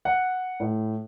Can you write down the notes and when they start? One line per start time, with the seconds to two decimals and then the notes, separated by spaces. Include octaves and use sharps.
0.05 F#5
0.60 A2